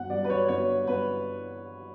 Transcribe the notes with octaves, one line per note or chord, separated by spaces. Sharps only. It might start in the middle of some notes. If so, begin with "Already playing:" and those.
Already playing: G1 F#5
G2 D5
B4
C#5
G1 C#5
G1 B4